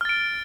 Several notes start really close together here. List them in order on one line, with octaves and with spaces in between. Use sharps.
F6 A6 D7